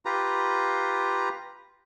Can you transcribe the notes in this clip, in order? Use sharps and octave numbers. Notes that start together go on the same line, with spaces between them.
F4 G4 B4 A#5